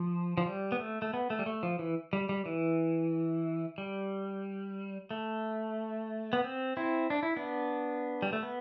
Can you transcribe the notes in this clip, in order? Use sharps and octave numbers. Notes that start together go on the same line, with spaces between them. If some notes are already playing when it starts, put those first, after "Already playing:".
Already playing: F3
F3
G3
B3
A3
A3
B3
A3
G3
A3
F3
E3
G3
G3
E3
G3
A3
B3
C4
C4 E4
D4
E4
B3 D4
G3
A3
B3